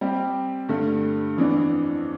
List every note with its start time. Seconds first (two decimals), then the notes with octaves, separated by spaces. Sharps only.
0.01 G3 C4 G4
0.69 G2 D3 A3
1.37 F2 E3 B3 D4